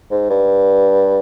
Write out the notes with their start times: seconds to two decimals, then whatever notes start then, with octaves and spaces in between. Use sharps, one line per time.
0.11 G#2
0.30 G2